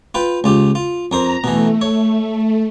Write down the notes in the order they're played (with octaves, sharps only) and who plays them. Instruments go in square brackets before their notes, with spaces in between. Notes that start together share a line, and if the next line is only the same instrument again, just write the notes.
[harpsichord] F4 B4 G5
C#2 F4 G4
F4
[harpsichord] F2 A#4 C5 [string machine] A#5
[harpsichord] B2 E3 [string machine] A3
[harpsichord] C#5